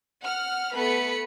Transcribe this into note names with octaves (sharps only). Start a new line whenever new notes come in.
F#5 F6
A3 B3 B4 B5 C#7